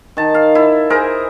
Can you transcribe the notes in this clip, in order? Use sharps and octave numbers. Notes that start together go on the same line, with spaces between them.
D#3 A5
F5
E4
G#4 A#4 C5